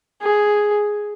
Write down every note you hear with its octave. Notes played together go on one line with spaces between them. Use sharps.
G#4